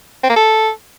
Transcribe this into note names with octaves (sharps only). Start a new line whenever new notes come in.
C4
A#3
A4